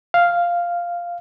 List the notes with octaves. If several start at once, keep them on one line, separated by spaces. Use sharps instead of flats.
F5